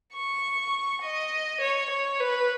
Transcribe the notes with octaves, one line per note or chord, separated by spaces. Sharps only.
C#6
D#5
C#5
C#5
B4